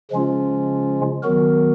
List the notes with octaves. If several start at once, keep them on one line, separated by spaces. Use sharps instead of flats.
C#3 F3 G#3 C#4 F4
D#3 F#3 B3 F#4 A#4